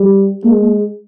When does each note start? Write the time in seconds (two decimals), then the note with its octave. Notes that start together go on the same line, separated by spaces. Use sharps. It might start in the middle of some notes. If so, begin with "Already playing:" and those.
Already playing: G3
0.44 G#3 A#3